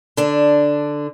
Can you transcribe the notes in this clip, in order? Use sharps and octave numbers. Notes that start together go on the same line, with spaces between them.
D3 D4